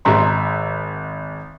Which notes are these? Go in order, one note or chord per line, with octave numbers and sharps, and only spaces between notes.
G#1 G#3 G#4 E5 A#5 C6